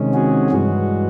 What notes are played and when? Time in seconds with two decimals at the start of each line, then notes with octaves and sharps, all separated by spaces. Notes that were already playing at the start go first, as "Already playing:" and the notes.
Already playing: C3 D#3 G#3 C#4
0.14 F#4 G#4
0.50 G2 E3 G#3 F#4